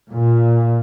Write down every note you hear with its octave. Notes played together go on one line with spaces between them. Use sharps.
A#2